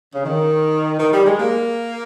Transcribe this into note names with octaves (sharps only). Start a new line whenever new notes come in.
C#3
D#3
D#3
G3
G#3
A#3